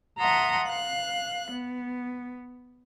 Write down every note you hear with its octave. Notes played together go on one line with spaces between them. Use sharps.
E5 F#5 A5 A#5 C6 D#6
F5 F#6
B3